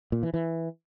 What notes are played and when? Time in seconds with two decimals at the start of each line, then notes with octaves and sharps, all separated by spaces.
0.12 A#2
0.23 E3
0.34 E3